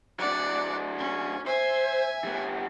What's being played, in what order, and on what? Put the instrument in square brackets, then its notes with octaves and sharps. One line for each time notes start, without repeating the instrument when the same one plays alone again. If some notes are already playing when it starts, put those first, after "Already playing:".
[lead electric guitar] F#3 D4 [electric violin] D5 F#5
[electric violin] C#4
[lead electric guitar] C5 [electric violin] E5 G#5
[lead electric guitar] G3 B3